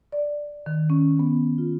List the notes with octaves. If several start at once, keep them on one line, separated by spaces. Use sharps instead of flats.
D5
D#3
C#4
B3
F4